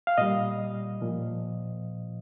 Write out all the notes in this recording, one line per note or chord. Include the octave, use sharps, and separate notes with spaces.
F5
A#2 G3 D#5
A#2 F3